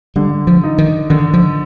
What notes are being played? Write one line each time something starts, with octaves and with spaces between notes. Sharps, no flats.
D3 G3
F3
D#4
D#3
D3 D#3
F3